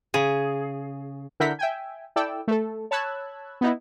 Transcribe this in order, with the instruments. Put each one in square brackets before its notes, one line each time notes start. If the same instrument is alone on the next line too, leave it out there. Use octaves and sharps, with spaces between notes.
[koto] C#3 G#4
[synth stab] D3 E4 A#4 F#5 G6 B6
E5 G5 G#5
E4 A4 D5 G5 E6
A3 A4
C#5 A5 B5 E6 F#6 G#6
B3 D#4 E4